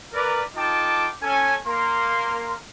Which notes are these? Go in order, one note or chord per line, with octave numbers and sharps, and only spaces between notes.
A#4 B4 D5
D#4 F4 A4 G5 A5 D6
C#4 A4 G#5
A#3 A#4 C6